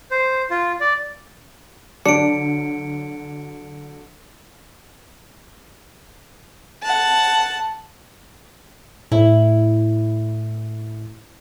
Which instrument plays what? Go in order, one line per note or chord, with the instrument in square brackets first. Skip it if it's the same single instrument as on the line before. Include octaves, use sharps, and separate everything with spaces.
[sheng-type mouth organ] C5
F4
D5
[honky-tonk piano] D3 F#3 [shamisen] D4 [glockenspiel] C#7 D7
[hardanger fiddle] F#5 A5
[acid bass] A2 [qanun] E4